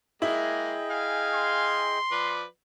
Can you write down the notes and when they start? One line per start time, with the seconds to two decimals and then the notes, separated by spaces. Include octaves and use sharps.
0.22 G#3 A#3 E4 G#4 D#5 G5
0.90 F5 G#5
1.34 C6
2.11 F3 B4 D5